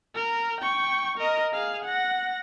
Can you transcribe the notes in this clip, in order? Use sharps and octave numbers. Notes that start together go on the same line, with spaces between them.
A#4
G5 C#6
A#4 D#5
G#4 F5
F#5 A#6